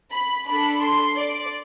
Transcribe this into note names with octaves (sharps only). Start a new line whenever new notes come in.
B5
D4 A4 B5
C6
D5